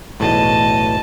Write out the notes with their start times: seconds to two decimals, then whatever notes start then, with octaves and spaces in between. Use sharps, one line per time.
0.20 B1 E2 A2 D#5 A5